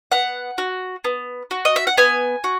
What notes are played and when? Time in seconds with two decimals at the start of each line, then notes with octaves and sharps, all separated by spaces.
0.12 B3 F#5
0.58 F#4
1.04 B3
1.51 F#4
1.65 D#5
1.76 E5
1.87 F#5
1.97 B3 G#5
2.44 F#4